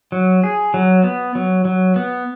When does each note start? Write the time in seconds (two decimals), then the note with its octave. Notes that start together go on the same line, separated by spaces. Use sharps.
0.12 F#3
0.44 G#4
0.74 F#3
1.04 B3
1.35 F#3
1.65 F#3
1.96 B3